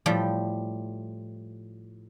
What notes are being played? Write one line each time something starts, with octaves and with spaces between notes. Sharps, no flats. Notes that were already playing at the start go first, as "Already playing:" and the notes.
A2 F3 G3 G5